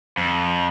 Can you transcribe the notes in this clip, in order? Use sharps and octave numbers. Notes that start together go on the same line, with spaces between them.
F2